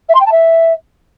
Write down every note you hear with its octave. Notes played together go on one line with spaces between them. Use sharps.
E5
C6
G5
A5
E5